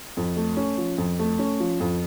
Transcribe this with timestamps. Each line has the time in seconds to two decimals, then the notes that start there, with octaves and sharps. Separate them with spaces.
0.17 F2
0.36 A3
0.57 C#4
0.78 F3
0.98 F2
1.19 A3
1.39 C#4
1.60 F3
1.80 F2